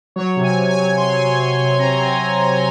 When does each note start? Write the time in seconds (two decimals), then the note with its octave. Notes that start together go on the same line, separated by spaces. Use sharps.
0.16 F#3 C#5
0.36 C3
0.44 G#5
0.57 C3
0.71 G#5
0.77 F#3
0.98 C3 C6
1.19 F#3
1.38 F#3 C6
1.59 C3
1.79 C4 A#5
2.00 C4